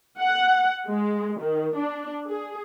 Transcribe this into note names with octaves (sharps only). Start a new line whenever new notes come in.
F#5
G#3
D#3
D4
G#4